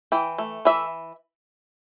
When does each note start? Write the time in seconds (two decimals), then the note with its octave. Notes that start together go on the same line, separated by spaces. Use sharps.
0.12 E3 G5
0.38 A3
0.65 E3 E5